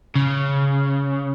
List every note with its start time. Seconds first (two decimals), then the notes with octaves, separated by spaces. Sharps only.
0.15 C#3